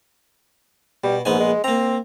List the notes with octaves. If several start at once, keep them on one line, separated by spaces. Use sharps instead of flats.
B2 G3
A#1 G#2 B3 G#5
G#3
A#3 C4 A#5